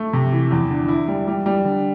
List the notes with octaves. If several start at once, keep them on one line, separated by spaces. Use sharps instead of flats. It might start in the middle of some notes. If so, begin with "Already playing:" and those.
Already playing: A3
C3
E3
E2
D3
E4
G3
G3
G3
D3